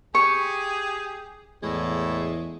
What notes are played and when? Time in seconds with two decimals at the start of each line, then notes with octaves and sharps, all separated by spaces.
0.15 G4 G#4 C#6
1.63 E2 A2 G#3